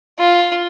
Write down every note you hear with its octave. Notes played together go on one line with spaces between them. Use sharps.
F4